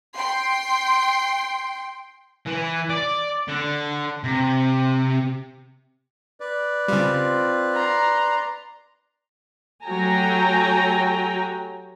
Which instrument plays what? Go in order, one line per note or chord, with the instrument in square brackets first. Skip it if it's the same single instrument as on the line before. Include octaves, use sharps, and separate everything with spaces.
[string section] G5 C6
[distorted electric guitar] E3
D5
D3
C3
[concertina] B4 D5
[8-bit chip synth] C#3 G3 [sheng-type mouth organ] C4 F4
[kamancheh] A#5 C6
[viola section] F#3 A3 G4 G5 G#5 A#5